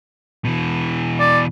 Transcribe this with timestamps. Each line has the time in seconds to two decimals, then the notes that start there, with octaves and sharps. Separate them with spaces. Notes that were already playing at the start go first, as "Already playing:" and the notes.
0.45 B2 E3
1.20 D5